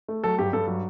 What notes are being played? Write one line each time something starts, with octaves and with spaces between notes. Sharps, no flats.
A3
F#3 A4
G2 G4
G2 A4
F#3